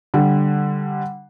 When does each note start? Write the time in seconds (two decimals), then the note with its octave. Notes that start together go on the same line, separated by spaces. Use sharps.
0.14 D3 G3